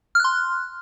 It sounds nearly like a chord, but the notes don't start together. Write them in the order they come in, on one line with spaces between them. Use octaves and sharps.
F6 F#6 C6